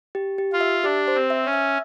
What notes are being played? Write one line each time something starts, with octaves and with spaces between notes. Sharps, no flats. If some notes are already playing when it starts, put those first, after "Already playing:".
G4
G4
F4
E5
D4 G4
C5
C4
E5
C#4
E5